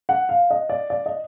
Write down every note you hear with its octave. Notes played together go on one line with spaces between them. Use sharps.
F#5
F5
D#5
D5
D5
D#5